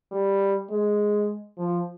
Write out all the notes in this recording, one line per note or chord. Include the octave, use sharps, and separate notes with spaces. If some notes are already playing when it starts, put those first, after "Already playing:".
G3
G#3
F3